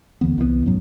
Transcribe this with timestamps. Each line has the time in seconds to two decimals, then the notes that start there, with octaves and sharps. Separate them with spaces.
0.21 D#2 D3 E3 B3
0.38 C2 E3 G3 B3
0.66 F#2 A2 F#3